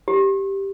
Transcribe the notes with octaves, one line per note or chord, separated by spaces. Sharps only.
G4